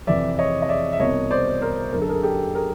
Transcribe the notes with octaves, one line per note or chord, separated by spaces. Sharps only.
F2 C3 E3 D5 E5
C#5 D#5
D#5
D5 E5
E5
C2 B2 C#5 D#5
C5 D5
A#4 C5
F#2 D3 A#4
A4
G#4 A#4
G4 A4
G#4 A#4